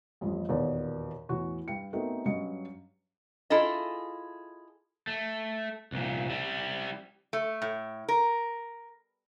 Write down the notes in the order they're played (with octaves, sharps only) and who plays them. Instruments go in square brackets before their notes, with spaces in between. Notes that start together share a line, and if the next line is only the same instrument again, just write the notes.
[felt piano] A1 F2 G3
E1 D#2 A#2 B3 D5
E2 A2 F#4 C#6
G2 G5 C#7
A3 B3 C4 D#4 F#4 A#4
G2 F#3 C#4 D#5 C#7
[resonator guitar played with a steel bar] E4 F4 G#4 A4 D#5
[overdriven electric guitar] A3
C2 A#2
G3 E4
[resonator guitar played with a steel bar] A3
A2
A#4